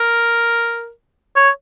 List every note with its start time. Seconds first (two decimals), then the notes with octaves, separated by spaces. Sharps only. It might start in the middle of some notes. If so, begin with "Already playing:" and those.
Already playing: A#4
1.36 C#5